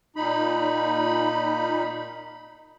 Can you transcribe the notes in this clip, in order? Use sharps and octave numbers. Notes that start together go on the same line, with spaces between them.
A#2 D#4 B5